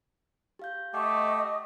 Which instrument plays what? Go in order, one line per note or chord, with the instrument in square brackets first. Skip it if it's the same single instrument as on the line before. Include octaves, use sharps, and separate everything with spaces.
[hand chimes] G4 F5 G6
[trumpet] A3 [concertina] G4 [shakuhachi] D#5 [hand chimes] F#5 C#6 D6